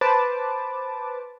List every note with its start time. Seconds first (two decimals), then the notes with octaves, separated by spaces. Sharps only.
0.01 B4 C5 A5 D6